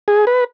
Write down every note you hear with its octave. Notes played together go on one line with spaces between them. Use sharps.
G#4
B4